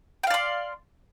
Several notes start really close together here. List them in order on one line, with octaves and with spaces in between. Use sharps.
G5 F5 D5 C6